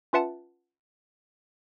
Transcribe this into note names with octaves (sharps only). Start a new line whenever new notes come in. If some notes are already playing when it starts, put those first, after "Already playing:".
C#4 F4 B4 E5 F#5 A5